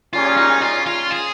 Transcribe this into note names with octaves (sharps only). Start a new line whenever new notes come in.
A#2 G3 C#4 F4 G#4
D#4
F4
F4
G#4